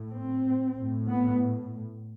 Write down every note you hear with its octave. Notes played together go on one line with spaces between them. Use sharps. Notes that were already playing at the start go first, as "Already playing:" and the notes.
Already playing: A2
C4
A2
B3